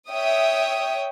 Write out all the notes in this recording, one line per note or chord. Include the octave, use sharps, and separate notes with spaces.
C#5 E5 G5 D#6